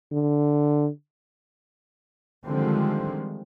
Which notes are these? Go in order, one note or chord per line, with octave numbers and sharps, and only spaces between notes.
D3
D3 D#3 F3 G3 G#3 C4